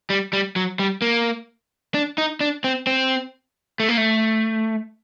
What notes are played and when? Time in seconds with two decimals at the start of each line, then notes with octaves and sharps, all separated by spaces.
0.10 G3
0.33 G3
0.56 F#3
0.79 G3
1.02 A#3
1.94 D4
2.18 D#4
2.41 D4
2.64 C4
2.87 C4
3.80 A3
3.89 A#3
3.97 A3